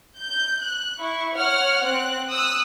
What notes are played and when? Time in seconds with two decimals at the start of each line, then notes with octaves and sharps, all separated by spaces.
0.17 G6
0.63 F#6
0.99 E4 C#6
1.36 C#5 F#5 F6
1.83 C4 F#6
2.29 D#6 E6 F#6